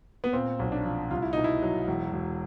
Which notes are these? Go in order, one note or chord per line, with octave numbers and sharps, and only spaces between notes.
B3
A#2 C4
B1
D4
F3
C2 F4
E4
B2 D#4
E4
F#3
E1
E1